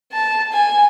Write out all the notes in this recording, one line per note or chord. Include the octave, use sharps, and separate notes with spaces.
A5
G#5